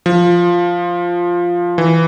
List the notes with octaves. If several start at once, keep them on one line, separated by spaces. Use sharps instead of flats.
F3
E3